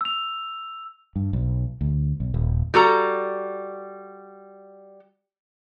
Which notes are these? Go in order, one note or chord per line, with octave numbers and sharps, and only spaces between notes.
E6 F7
G2
B1
D2
B1
D#1
G3 F#4 A4 A#5